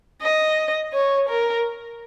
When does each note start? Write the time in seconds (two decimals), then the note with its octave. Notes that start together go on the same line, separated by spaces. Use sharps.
0.22 D#5
0.93 C#5
1.29 A#4